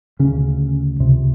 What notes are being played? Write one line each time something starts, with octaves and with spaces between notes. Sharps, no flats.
D2 C#3 C#4
C#2 C3